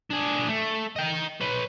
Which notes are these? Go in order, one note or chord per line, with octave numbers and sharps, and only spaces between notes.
D4 G#4
A3
D#5 G5
B4 C#5